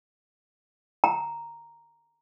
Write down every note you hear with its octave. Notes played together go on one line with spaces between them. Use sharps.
A#5